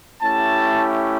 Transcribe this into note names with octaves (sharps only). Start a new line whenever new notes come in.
A3 C#4 E4 G4 A5